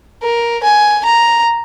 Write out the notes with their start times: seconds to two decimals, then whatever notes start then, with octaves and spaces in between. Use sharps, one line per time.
0.22 A#4
0.63 G#5
1.05 A#5